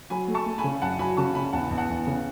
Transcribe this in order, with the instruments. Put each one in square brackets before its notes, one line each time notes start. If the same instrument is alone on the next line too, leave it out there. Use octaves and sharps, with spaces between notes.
[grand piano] F#3 [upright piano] G#5 B5
[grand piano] A3
[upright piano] A5 C#6
[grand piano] A3
[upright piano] G#5 B5
[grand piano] C#3
[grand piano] F#2 [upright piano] F#5 A5
[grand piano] F#3 [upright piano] G#5 B5
[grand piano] C#3 [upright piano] A5 C#6
[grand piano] C#3 [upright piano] G#5 B5
[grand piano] E2 [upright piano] F#5 A5
[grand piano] E2
[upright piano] F#5 A5
[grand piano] E2
C#3